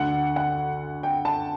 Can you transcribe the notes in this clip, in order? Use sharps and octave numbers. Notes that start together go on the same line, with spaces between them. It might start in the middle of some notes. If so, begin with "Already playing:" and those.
Already playing: D2 D3 F#5
F#5
G5
A5